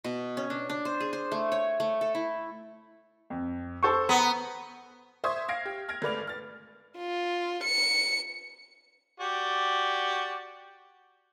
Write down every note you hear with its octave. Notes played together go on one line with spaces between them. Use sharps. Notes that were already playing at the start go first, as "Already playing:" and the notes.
B2
C#4
D4
D4
C5
G#4
C5
A3
C#5
A3
A4
E4
F2
A4 C5 C#6
B3 A#5
C5 E5 C6 C#6 D#6 G#6
F5 F6 G#6 A#6 C7 D7
G4
F6 G#6 A#6 D7
G#1 A3 B4 D5 F7
F6 A6
F4
C#7
F#4 G4 D5